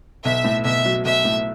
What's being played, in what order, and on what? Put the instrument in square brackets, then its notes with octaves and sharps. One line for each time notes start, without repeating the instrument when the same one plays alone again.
[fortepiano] B1 [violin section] E5
[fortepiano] A2
[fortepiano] B1 [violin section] E5
[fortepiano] F#3
[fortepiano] B1 [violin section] E5
[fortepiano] A2